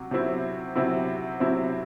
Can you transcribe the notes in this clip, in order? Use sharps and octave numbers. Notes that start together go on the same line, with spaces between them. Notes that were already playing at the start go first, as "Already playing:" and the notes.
Already playing: C3 F#3
C3 F#3 C4 E4
C3 F#3 C4 E4
C3 F#3 C4 E4